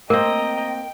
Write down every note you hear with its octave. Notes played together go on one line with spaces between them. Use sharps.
A#3 C4 A#4 D#5 G5 A#5